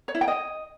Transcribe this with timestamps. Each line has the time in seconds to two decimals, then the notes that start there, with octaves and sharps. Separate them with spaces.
0.08 C#5
0.15 E4
0.21 G5
0.28 D#5